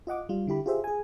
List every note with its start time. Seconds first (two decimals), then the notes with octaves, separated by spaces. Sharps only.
0.07 F4 D#5 F#5 D6
0.29 G3 F4
0.47 D3 E4 G4 B5
0.66 F4 G4 G#4 C5 E5
0.84 G#4 G#5